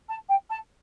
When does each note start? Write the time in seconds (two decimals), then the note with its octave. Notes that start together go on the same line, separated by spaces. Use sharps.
0.09 A5
0.29 G5
0.50 A5